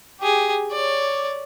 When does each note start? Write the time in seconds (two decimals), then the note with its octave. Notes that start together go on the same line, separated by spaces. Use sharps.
0.20 G4 G#4
0.71 C#5 D5